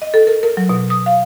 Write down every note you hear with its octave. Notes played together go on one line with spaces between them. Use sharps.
D#5
A4
A#4
A#4
F#3
B2
D#6
F5